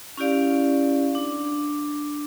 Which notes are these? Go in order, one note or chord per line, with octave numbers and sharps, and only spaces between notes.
C#4 E4 G4 D5 F5
D4